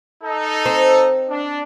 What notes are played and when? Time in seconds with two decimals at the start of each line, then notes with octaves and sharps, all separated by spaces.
0.23 D#4 A4
0.65 C4
1.29 D4